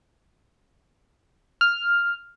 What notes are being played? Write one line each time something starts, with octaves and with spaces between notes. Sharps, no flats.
F6